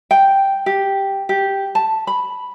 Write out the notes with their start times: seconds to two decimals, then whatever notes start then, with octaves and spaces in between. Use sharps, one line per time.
0.11 G5
0.66 G4
1.29 G4
1.75 A5
2.07 B5